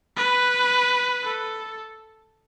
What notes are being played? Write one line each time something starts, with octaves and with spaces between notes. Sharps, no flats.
B4
A4